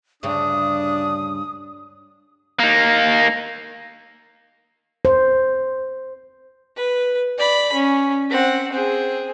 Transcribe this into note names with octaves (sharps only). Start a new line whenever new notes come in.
D2 G2 C#3 D4 D#6
A#3 D#4
C5
B4
D5 B5
C#4
C4 F#5
C4 G#4